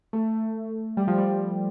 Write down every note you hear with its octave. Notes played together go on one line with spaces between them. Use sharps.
A3
G3
F3
G3